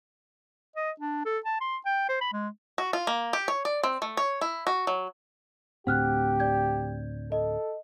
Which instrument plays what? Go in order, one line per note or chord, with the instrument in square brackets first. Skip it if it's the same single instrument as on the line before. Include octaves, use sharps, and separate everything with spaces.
[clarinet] D#5
D4
A4
A5
C6
G5
C5
B5
G#3
[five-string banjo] F#4
F4
A#3
G4
C#5
D5
C4
A3
C#5
E4
F#4
F#3
[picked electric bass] D2 A2 C4 [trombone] G4 [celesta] F#5 F6 F#6
[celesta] D5 G6 G#6
[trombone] A4 [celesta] D#5